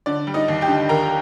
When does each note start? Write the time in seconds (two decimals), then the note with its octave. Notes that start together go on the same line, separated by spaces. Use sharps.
0.06 D3 D5
0.27 G3
0.34 D#4 D#5
0.48 D#2
0.61 G4 G5
0.68 D3
0.89 D#2 A#4 A#5